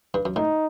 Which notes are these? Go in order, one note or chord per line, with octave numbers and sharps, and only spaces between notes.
G2
F#2
A2 D#4